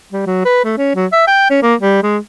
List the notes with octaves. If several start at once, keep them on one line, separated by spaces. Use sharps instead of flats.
G3
F#3
B4
A3
C#4
F#3
E5
G5
C#4
A#3
G3
G#3